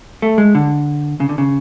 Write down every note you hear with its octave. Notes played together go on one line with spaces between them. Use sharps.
A3
G#3
D3
C#3
D3
C#3